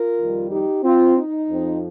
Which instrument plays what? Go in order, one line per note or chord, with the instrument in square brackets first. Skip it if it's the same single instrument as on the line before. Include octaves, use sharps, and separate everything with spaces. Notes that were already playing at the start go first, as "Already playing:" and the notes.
Already playing: [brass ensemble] F4 A#4
F2 D#3 G3
D#4 G4
C4 F4
D#4
F2 F3 C4